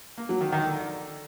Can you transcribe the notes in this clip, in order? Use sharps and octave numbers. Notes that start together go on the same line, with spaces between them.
A#3
F#3
D#3
D#3
D3